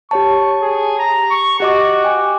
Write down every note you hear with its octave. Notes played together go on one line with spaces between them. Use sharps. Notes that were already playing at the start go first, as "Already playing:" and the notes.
G4 C#5 A5 C#6
G#4
A#5
C#6
F#4 G4 D#5 D6
G5 G#5 D6